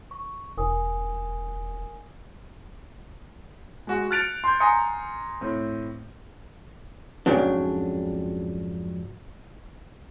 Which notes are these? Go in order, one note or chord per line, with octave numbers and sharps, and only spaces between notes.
C#6
E1 A#4 G#5 D#6
G#3 F#4
F6 F#6 A6 C#7 D7 F7
C6 G6
G#5 A#5 C6 D#6 C#7
A2 C4
F2 G#2 C#3 F#3 D4